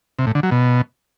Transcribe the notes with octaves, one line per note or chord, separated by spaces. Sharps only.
C3
A2
D3
F#3
B2